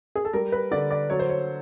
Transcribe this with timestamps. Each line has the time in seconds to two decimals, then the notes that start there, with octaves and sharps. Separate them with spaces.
0.16 G#4
0.25 A4
0.33 G3 A#4
0.52 B4
0.71 D3 D5
0.91 D5
1.10 F#3 C#5
1.19 C5
1.29 C#5